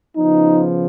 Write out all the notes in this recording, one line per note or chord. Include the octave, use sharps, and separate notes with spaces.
C#3 F3 B3 D#4